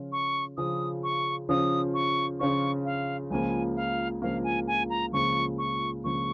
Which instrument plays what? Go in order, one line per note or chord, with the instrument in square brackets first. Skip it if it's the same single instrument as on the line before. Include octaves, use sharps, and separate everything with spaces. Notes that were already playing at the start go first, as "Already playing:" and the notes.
Already playing: [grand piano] C#3 F3 C#4 F4
[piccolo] C#6
[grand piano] C#3 F3 C#4 F4 [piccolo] D#6
[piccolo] C#6
[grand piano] C#3 F3 C#4 F4 [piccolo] D#6
[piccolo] C#6
[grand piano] C#3 F3 C#4 F4 [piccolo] C#6
[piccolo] F5
[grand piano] C#2 C#3 F3 A#3 [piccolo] G#5
[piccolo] F5
[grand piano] C#2 C#3 F3 A#3 [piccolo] F5
[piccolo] G#5
G#5
A#5
[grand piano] C#2 C#3 F3 A#3 [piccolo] C#6
[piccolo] C#6
[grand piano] C#2 C#3 F3 A#3 [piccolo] C#6